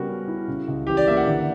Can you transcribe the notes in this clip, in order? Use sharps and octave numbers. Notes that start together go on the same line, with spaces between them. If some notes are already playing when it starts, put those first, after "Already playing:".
Already playing: C#3 G3 B3 F#4 A#4
C#4
E4
C#3
C#2
E3 G4
D5
A#3 E5
F#5
D3